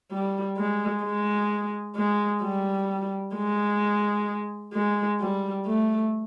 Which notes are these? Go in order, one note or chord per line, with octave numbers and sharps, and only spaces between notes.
G3
G#3
G#3
G#3
G3
G#3
G#3
G3
A3